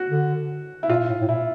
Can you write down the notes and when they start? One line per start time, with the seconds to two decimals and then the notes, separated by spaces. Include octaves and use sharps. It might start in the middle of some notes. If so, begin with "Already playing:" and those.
Already playing: F#4
0.10 D3
0.83 E4
0.89 A#2 F4
1.09 A2
1.21 A2
1.29 A#2 E4